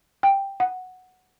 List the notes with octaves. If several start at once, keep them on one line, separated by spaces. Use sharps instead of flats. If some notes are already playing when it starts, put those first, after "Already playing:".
G5
F#5